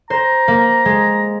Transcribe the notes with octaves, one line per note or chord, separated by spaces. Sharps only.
C5 A#5
A#3
G#3